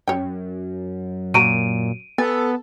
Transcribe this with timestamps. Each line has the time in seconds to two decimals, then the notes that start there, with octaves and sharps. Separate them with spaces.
0.08 F#2 C#5 G5
1.34 A#2 F#4 A#5 D7 D#7
2.18 B3 A4 G#5